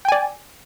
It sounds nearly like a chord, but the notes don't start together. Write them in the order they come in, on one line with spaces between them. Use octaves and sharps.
G5 G#5 D5